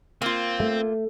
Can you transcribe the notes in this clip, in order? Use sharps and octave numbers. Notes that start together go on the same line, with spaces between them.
A#3 C4 F4
A3